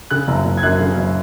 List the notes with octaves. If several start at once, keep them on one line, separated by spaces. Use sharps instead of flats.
C#3 F#6
F#1
F#1
G#6
F#2 F#6
C#3
F#1